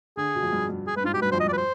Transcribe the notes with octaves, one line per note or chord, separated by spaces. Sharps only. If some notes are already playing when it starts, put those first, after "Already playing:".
D3 G#4
B2
F2
G2
G2
G#4
G2 B4
G#2 F4
B2 G4
G2 B4
F2 C5
D#5
G2 D5
B4
C5